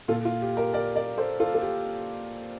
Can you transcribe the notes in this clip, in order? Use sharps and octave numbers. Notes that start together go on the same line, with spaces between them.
A#2 F4 A4
F4
G4
G4 A#4
A#4 D5
A#4 D5
A4 C5
F4 A4
A4
G4